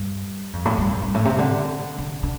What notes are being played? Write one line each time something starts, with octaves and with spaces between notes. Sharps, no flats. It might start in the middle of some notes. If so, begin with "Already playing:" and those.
Already playing: G2
F2
A2
G2
F2
G2
A2
C3
D3
D3
D3